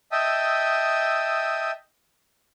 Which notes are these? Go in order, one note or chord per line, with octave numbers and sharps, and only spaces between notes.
D#5 E5 G5 A5 D#6 E6